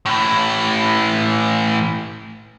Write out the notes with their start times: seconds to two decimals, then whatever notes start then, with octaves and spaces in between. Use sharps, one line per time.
0.06 A2 E3